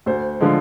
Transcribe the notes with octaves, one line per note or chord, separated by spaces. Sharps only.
D2 C5
D3 F3 G#3